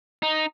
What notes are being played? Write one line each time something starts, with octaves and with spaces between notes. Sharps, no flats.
D#4